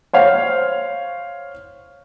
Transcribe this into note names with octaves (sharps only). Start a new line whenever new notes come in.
C5 C#5 F5